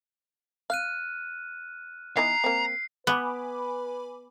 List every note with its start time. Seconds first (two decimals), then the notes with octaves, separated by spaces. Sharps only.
0.70 F5 F6 F#6 D#7
2.17 E3 B3 D#4 A#5 C7
2.44 A#3 C4
3.07 B3 B4 G#5 B5 D6